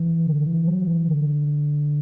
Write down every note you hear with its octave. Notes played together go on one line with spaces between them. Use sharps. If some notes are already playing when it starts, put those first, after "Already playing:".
Already playing: E3
D3
E3
F#3
E3
D3